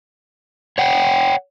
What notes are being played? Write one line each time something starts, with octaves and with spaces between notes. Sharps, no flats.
C#5 F#5 G5